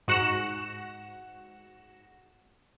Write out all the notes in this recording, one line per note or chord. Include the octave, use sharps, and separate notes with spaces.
G#2 F#4 F#5 A#6 E7